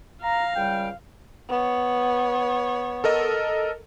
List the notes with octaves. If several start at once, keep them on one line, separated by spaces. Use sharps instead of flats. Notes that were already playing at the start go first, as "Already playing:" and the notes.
F5 A#5
C#2 G3 G5
B3 C#5
A4 A#4 D#5